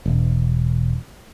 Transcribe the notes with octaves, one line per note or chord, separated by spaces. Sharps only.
E1